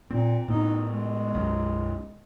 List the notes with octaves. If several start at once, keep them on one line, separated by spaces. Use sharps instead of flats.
A#2 C4
A2 B3 D#4
G#3
B1 F#2 F#3